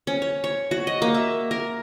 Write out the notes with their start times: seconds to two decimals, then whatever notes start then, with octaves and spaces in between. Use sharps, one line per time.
0.07 C#4
0.22 C#5
0.44 C#5
0.71 F#4
0.87 D#5
1.02 A#3
1.14 E5
1.51 A#4